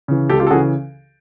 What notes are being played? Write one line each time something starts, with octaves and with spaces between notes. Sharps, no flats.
C#3 E3
C#2 G4 A4
F4 G4
A4
C#3 E3 F#4 G#4